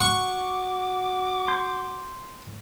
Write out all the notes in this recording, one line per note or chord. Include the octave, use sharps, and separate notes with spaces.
F#4 F#5 C#6 D6
C6 G6